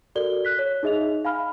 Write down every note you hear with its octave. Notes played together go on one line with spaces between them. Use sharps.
F#4 A4 A#4 D5 G7
F#6 B6
C#5
D#4 G#4 D#5 E5 F7
F5 G#5 B5 F6